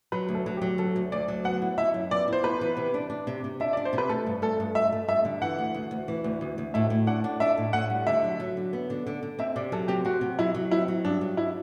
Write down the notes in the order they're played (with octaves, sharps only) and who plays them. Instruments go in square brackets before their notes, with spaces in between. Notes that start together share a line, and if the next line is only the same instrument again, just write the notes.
[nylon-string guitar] F#3 [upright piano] B4
[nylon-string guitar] D2
[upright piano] A4
[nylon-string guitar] F#3
[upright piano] G4
[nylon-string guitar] F#3
[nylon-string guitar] D2 [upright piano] A4
[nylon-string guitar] D2
[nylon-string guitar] D2 [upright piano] D5
[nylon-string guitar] F#3
[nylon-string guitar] B3 [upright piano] F#5
[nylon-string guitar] E4
[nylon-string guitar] E4 [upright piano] E5
[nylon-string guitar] F#2
[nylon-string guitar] B3 [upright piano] D5
[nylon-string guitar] E4 [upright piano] C5
[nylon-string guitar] B3 [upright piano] B4
[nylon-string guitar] E3
C3
D4
D4
C3
C3
[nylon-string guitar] D4 [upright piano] E5
[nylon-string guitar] D4 [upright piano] D5
[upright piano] C5
[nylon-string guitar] C3
[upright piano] B4
[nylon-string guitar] A3 [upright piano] A4
[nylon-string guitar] G2
[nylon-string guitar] A3 [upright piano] A4
[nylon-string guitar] G2
[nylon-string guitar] A3 [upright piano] E5
[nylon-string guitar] A3
[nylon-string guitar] G2 [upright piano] E5
[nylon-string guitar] D3
[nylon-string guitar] E3 [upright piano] F#5
[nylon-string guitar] D2
D2
D2
E3
D2
D2
D2
[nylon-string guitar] A2 [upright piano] E5
[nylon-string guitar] A2
[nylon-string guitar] D4 [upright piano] F#5
[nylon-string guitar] D4
[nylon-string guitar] D4 [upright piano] E5
[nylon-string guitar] A2
[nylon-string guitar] A2 [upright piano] F#5
[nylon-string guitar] G3
[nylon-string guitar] D3 [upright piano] E5
[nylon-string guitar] F#3
F#3
D3
B3
D3
D3
D3
[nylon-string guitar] C4 [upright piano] E5
[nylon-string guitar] C3 [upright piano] D5
[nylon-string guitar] F#3 [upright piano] A4
[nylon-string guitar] C4 [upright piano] G4
[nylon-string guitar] C4 [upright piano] F#4
[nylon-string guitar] C3
[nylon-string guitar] F#3 [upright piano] E4
[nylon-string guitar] F#3
[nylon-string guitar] C4 [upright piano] E4
[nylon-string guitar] F#3
[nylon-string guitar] G2 [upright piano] D4
[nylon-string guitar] F#3
[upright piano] E4